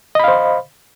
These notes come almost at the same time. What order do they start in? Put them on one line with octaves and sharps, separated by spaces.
D#5 B5 F5 C5